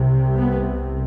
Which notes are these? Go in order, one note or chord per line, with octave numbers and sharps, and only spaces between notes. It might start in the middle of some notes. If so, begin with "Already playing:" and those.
Already playing: C2 C3
B3